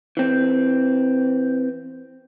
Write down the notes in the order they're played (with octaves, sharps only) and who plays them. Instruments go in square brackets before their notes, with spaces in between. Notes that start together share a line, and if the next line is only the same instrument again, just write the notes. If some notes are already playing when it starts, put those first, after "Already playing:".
[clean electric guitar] E3 C4